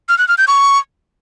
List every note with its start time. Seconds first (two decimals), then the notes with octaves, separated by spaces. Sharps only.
0.09 F6
0.18 F#6
0.28 F6
0.38 G6
0.48 C#6